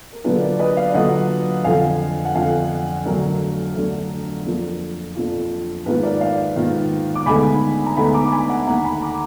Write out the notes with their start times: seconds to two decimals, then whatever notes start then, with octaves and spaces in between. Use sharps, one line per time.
0.12 A#4
0.24 D3 F#3 A#3 D4 F4 G#4 B4
0.41 A#4 D5
0.59 B4 D#5
0.76 D5 F5
0.94 D3 F#3 A#3 D4 F4 D#5 F#5
1.64 F2 D3 F3 F5 G#5
2.25 F#5
2.35 F2 D3 F3 F5 G#5
3.05 D2 D3 F#3 D4 A#4
3.75 D2 D3 F#3 D4
4.46 F2 F3 A#3 D4 F4 A#4
5.16 F2 F3 A#3 D4 F4
5.86 G#2 D#3 A#3 F4 G#4 B4
6.03 A#4 D5
6.21 D5 F5
6.56 G#2 D#3 A#3 F4
7.15 D6
7.26 D2 D3 G#3 B3 D#4 G#5 B5
7.86 A#5
7.97 D2 D3 G#3 B3 D#4 G#5 B5
8.14 A#5 D6
8.32 G#5 B5
8.49 F#5 A#5
8.67 D#2 D#3 A#3 F#5 A#5
8.84 G#5 B5
9.02 A#5 D6